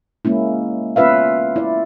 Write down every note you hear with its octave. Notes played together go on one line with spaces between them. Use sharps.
G#3 A#3 C#4 E4
B3 C#4 F4 B4 E5 F5
E4 D5